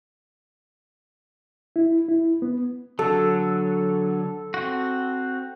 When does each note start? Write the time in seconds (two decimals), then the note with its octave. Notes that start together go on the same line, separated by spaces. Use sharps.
1.76 E4
2.09 E4
2.42 B3
2.99 D3 F#3 A4
4.54 C4 F#4